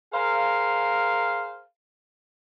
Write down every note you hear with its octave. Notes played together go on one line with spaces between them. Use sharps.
G#4 A#4 C5 F5